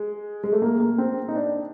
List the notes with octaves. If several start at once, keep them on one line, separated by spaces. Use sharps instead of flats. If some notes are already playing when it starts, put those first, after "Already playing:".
Already playing: G#3
G#3
A3
A#3
A#3
C4
D#4
D4